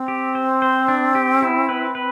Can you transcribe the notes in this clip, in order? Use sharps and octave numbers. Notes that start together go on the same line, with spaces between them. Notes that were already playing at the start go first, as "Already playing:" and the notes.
Already playing: C4
G4
C5
C5
D4
G4
E4
B4
B4